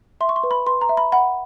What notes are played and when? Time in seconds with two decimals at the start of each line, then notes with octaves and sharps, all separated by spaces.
0.21 E5 C6
0.29 C#6
0.36 C6
0.43 B4
0.51 B5
0.66 B4 C6
0.81 A#5
0.89 E5
0.97 B5
1.12 F#5 B5